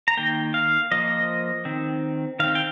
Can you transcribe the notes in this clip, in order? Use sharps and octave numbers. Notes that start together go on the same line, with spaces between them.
A#5
D#3 A#3 G5
F5
F3 A#3 D#5
D#3 C4
D#3 C4 F5
G5